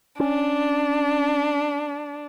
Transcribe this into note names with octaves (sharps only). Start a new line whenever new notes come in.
C#4 D4